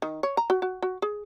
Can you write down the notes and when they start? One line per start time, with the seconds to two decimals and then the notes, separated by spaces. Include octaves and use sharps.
0.02 D#3
0.23 C#5
0.37 A#5
0.50 F#4
0.62 F#4
0.82 F#4
1.02 G#4